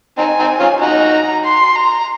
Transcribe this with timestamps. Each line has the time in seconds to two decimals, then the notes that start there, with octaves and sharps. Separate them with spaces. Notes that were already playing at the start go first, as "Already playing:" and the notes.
0.18 C4 D#4 G#5
0.39 C4 D#4
0.59 C#4 F4
0.81 D#4 F#4 A#5
1.44 C6
1.75 A#5